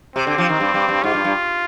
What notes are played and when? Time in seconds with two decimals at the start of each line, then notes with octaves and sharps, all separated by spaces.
0.16 C3 C4
0.27 D3
0.38 F3
0.49 D#3
0.60 G2
0.74 G2
0.89 G2
1.03 G#2 F4
1.14 G2
1.24 G2